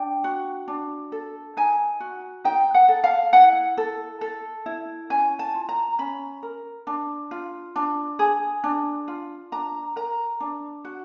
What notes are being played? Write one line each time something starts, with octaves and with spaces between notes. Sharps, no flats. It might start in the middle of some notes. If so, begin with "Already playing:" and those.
Already playing: D4 G5
F#4
D4
A4
D#4 G#5
F#4
D#4 G5
F#5
A4
F5
E4 F#5
A4
A4
E4
C#4 G#5
A5
F4
A#5
C#4 B5
A#4
D4
F4
D4
G#4
D4
F4
D4 A#5
A#4 A#5
D4
F#4